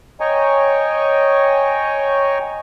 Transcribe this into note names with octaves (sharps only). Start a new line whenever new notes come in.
C#5 D#5 G5 G#5 A#5 C#6